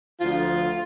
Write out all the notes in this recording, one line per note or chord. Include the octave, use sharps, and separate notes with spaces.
D2 D3 F3 F4